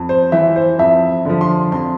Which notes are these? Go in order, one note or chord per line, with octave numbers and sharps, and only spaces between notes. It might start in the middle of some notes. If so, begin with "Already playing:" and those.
Already playing: F2
C5
E3 E5
C5
F2 E5
D3 F3
C6
F2 C6